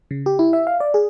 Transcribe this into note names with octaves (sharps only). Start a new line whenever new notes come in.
C#3
G4
E4
E5
F5
D5
G#4